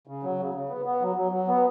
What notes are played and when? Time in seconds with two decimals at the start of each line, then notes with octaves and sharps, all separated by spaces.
0.07 C#3
0.23 F#3
0.39 C#3
0.54 C#3
0.69 B3
0.85 B3
1.01 F#3
1.16 F#3
1.32 F#3
1.48 B3